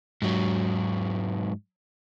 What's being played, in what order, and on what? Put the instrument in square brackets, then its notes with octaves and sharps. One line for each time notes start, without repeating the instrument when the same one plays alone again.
[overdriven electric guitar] G#2 F#3